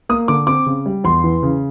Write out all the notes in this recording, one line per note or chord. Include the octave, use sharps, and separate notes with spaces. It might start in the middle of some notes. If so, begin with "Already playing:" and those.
A#3 D#6
D3 D6
C4 D6
C#3
G3
E2 C6
E3
C#3